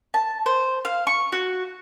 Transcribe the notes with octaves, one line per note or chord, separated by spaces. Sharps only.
A5
C5
F5
C#6
F#4